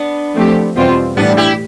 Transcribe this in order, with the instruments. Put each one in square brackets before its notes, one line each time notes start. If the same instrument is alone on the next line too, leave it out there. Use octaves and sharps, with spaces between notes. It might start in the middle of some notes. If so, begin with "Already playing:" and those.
Already playing: [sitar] B3 D4
[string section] F3 A3 C4 G4
E2 B2 G3 C4 F4
[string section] A2 E3 G3 [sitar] B3 D4
[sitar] E4 G4